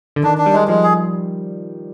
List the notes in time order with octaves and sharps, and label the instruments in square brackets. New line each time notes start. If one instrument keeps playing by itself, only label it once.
[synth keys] D3
[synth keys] D#3 [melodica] D4
[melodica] D4
[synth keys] G3
[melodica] G#3
[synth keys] F3 [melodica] G#3
[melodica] G#4